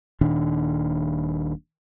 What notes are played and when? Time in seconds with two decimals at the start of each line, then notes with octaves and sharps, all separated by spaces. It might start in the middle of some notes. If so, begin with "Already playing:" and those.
0.21 D#1 A#2 D#3 D4